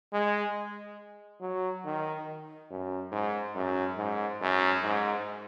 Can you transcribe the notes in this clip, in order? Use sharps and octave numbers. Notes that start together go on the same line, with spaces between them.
G#3
F#3
D#3
F#2
G#2
F#2
G#2
F#2
G#2